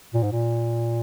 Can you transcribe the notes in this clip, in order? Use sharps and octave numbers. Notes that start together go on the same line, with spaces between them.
A#2
G#2
A#2